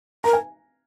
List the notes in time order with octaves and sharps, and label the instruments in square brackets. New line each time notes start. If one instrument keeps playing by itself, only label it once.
[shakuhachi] A#4 [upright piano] A#5
[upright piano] G#5